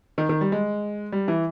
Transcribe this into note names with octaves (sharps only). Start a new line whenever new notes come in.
D#3
D#3
G3
G#3
G3
E3